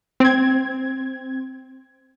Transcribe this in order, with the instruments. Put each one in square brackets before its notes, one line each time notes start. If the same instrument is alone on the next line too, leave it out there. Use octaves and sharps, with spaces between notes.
[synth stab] C4 G#6